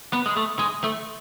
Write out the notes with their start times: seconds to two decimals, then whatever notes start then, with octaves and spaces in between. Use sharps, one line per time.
0.13 B3
0.26 G#3
0.37 A3
0.59 G#3
0.84 A3